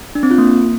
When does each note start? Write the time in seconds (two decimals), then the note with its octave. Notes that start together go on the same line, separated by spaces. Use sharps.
0.15 D4
0.23 C4
0.31 F4
0.38 A#3